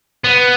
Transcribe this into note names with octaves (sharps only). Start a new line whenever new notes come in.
B3